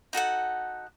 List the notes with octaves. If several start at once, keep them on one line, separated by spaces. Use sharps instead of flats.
D#4 F#4 A4 F#5